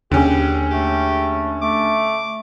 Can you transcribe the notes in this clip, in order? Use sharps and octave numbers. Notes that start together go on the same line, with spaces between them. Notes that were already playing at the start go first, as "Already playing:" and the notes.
D#2 D3 C#4 G4 G#4
A3 G4
A3 D6